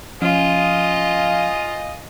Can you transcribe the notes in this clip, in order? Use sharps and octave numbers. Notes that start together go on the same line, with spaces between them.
F3 C#4 F4 D#5 F5 G#5 F6